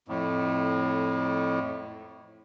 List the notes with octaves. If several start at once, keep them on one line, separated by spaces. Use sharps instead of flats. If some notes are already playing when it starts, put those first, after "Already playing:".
F2 A2